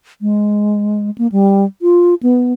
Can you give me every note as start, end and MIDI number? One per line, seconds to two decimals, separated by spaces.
0.21 1.10 56
1.18 1.27 58
1.32 1.65 55
1.82 2.15 65
2.23 2.53 59